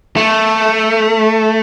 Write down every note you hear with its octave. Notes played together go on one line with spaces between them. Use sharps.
A3